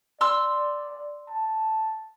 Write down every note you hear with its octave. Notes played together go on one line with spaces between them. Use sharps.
D5 C6 E6
A5